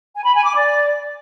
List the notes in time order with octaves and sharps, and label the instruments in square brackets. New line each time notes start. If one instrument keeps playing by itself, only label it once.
[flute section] G#5
B5
G#5
D6
D5